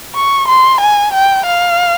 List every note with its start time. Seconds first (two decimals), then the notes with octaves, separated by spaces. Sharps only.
0.15 C#6
0.48 C6
0.81 G#5
1.14 G5
1.46 F5